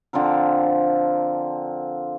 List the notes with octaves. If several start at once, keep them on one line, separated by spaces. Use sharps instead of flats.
D3 F3 C4 A#4